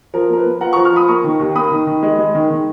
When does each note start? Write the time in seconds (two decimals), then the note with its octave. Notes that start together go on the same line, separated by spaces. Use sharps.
0.14 F3 A#4
0.29 A#3 A#4
0.37 B4
0.45 A#3
0.61 F4 F#5 A#5
0.73 A#5 C#6
0.76 F3
0.85 C#6 F6
0.93 F4 B5 D#6
1.08 A#3 A#5 C#6
1.24 D#3
1.40 D#2
1.55 A#3 B5 D#6
1.71 D#3
1.87 D#3
2.03 G#3
2.19 G#3
2.35 D#3
2.50 D#3